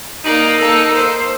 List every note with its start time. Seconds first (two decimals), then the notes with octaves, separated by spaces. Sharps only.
0.25 A#3 D#4 D5
0.58 A#3 A4 E6
0.94 C5